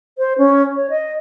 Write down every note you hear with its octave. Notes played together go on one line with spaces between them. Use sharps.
C5
C#4
C#5
D#5